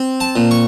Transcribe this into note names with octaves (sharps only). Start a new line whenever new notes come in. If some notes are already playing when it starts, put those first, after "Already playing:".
Already playing: C4
A5
A#2
C#6